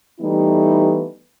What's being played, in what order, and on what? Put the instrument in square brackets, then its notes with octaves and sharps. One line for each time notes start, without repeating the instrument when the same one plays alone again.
[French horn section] E3 G3 A3 B3 D#4 E4